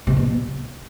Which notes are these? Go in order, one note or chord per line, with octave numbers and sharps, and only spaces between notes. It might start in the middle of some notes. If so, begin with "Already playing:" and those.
C3
B2
A#2